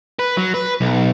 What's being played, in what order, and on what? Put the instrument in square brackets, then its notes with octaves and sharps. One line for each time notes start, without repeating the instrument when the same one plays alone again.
[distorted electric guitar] B4
F#3
B4
B1